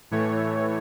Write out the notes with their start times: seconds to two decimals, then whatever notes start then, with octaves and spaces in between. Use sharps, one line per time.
0.11 A2 E3 A3 C#5